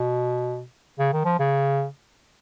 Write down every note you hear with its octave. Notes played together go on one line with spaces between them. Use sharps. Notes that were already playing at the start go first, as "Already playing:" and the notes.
Already playing: B2
C#3
D#3
F3
C#3